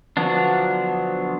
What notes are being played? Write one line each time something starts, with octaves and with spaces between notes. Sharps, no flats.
D3 F3 F#3 B3 D4